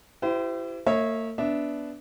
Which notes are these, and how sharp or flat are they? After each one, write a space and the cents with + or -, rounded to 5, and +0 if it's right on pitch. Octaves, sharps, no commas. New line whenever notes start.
E4 +25 G4 -25 C5 -35
A#3 -45 C#5 -15 E5 -35
B3 +0 D4 -15 E5 -15